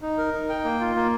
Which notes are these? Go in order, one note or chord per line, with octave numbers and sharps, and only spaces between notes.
D#4
A#4
D#4
G5
A#3
F4
A#3